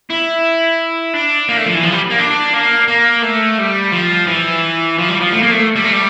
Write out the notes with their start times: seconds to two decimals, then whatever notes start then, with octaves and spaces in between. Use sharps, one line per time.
0.10 E4
1.14 D4
1.49 A#3
1.57 A3
1.66 F3
1.75 E3
1.83 F3
1.92 G3
2.10 A#3
2.19 D4
2.54 A#3
2.88 A#3
3.23 A3
3.58 G3
3.92 F3
4.28 E3
4.98 F3
5.08 G3
5.20 F3
5.32 A3
5.42 A#3
5.51 A3
5.76 G3
5.85 A3
5.93 G3